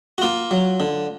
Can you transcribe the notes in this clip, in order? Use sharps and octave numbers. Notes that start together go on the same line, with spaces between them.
F#4
A#3 F4
F#3
D3